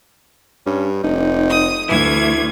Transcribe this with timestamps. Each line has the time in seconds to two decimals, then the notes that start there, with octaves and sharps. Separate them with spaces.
0.66 G2 C#4
1.04 F1 D#4
1.50 D#6
1.89 D2 E3 E4 G#6